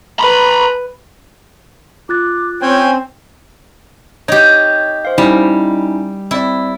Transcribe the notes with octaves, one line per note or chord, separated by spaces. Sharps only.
B4 A#5 B5
F4 D6 F#6 A6
C4 C#4 C#5 G5 G#5
D#4 G4 C#5
C5 F5
G3 C#4 D#4 E4
C4 E4 D5